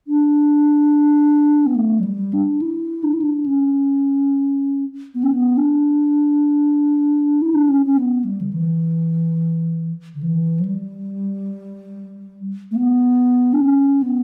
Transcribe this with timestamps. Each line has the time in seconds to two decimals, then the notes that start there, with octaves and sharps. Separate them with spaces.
0.07 D4
1.66 B3
1.76 A3
1.99 F#3
2.04 G3
2.33 D4
2.62 E4
3.04 D4
3.13 E4
3.22 D4
3.46 C#4
5.15 B3
5.23 C#4
5.32 B3
5.57 D4
7.42 E4
7.54 D4
7.69 C#4
7.86 C#4
7.97 B3
8.25 G3
8.41 D3
8.53 E3
10.15 D3
10.23 E3
10.60 F#3
10.65 G3
12.71 A3
12.76 B3
13.53 D4
13.61 C#4
14.02 B3